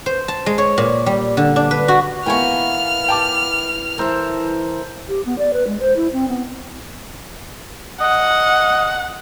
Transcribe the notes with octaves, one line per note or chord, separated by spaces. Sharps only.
C5
A5
G#3
C#5
A#2
G3
D3
D4
B4
F#4
E3 A#3 B3 G5 G#5 C#6 F6
G5 A5 D6
E3 A4 A#4 C5 E5
G4
B3
D5
B4
G#3
C5
E4
C4
B3
D#5 F#5